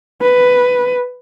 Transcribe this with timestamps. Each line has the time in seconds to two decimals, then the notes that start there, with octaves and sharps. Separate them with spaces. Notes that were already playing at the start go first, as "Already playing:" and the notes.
0.22 B4